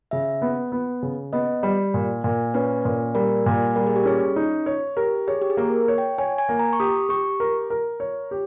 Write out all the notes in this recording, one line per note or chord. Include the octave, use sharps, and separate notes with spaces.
C#3 E5
B3
B3
C#3
B3 D#5
G3
A#2
A#2
C#4 B4
A#2
G3 A#4
A#2
G3 A#4
G#4
G4
C#4 G#4
D#4
C#5
G4 A#4
G#4 C#5
G4
G#4
A#3 A#4
C#5
G5
C#5 G#5
G#5
A#3
A#5
C#6
G4 D#6
G4 C#6
A#4
A#4
C#5
G4